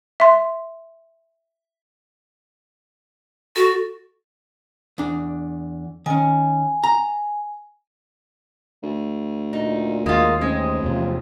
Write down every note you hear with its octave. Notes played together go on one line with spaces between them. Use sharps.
E5 C6
F#4 A4
E2 D4
D#3 C#4 G#5
A#5
D2
A#2 D#4
D#2 G#3 A#3 F4
A1 G#3 C4
E2 C3 F3